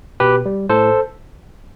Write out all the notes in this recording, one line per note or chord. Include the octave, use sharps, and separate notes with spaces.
B2 G4 B4
G3
A2 A4 C5